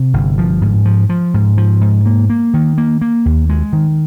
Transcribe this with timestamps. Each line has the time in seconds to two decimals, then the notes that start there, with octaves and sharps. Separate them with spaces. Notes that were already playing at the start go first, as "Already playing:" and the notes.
Already playing: C3
0.14 G1
0.38 F3
0.62 G#2
0.85 F3
1.09 F3
1.34 G#2
1.58 F3
1.81 G#2
2.06 A#3
2.30 A#3
2.54 D#3
2.78 A#3
3.01 A#3
3.26 D#2
3.49 G#3
3.73 D#3